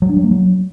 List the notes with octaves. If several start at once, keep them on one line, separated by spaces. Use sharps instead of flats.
F#3
D4
G3
A#3
F#3